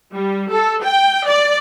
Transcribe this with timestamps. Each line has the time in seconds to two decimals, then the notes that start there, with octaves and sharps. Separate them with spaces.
0.14 G3
0.51 A4
0.84 G5
1.27 D5